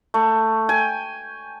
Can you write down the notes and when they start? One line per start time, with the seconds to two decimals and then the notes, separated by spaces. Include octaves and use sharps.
0.14 A3
0.69 G5 G#5